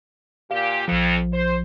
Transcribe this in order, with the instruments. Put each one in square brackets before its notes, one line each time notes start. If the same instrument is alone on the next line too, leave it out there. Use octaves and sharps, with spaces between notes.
[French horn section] A#2 G4 [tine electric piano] F5
[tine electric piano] A#1 F3 [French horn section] F2
[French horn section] C5